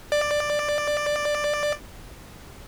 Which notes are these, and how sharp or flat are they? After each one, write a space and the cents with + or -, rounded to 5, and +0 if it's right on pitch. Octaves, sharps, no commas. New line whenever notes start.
D5 +10